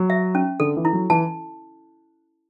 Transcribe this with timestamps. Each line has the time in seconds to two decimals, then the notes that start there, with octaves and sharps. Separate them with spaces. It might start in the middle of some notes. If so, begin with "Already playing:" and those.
Already playing: F#3
0.10 E5
0.35 C#4
0.60 D3 A4
0.77 E3
0.85 E4
0.93 F#3
1.10 E3 A5